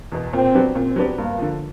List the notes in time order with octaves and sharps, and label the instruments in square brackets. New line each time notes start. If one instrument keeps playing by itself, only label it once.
[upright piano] E2 B2
[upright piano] A#2 [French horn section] C4
[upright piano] F#3 B3 D4 G4
[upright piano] A#2 [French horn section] C4
[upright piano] F#3 B3 D4 G4
[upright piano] G2 [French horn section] A#3
[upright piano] D3 F3